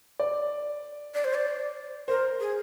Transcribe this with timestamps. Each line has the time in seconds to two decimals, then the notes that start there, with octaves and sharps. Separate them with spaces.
0.19 D5
1.14 D5
1.25 C5
1.34 D5
2.08 A#4 C5
2.40 G#4